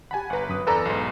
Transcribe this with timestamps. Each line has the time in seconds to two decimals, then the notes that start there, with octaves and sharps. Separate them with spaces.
0.11 G4 F#5 G#5 A5 B5
0.30 G1 B4 F#5 A#5
0.50 F#2 B5 D#6
0.67 E2 A4 B4 D5 A#5 B5
0.85 B1 G#2